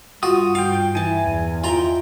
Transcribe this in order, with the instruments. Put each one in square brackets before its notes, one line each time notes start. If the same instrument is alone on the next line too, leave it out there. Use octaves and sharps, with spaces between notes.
[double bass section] G2 [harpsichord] F4 F#4 [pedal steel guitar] D#6
[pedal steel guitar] F4 G5 [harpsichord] F5
[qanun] E3 A5 [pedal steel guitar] G#5
[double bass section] E2
[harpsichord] F4 A#5 [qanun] D#5 E5 G5